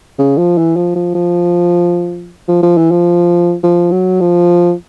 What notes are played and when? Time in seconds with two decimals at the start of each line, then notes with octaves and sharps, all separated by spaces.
0.19 C#3
0.38 F3
0.58 E3
0.76 F3
0.96 F3
1.15 F3
2.48 F3
2.63 F3
2.78 E3
2.91 F3
3.64 F3
3.92 F#3
4.21 F3